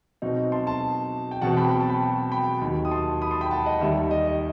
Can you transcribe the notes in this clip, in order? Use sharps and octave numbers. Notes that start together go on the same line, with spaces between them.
B2 F#3 C4 D#4
A5 C6
A5 C6
G5
E2 B2 F#3 C4 F#5 A5
G5 B5
B5
A5
G5 B5
G5 B5
D#2 D#3 F#3
D#6
A5 C6
B5 D#6
A5 C6
G5 B5
F#5 A5
D#5 F#5
D#2 D#3 G3 E5
D#5
D#5